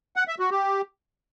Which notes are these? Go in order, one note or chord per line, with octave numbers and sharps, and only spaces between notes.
F#5
E5
F#4
G4